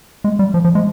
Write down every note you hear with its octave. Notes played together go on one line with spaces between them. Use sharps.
G#3
G3
F3
F3
G#3